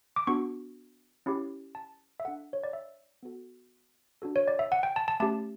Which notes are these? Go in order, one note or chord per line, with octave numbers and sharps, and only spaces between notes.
D6
B3 D4 F#4 C#6
C#4 E4 G4
A5
E5
D4 A4 F#5
C#5
D5
E5
B3 F#4 A4
D4 F#4 A4
C#5
D5
E5
F#5
G5
A5
A5
A3 C#4 G4 A5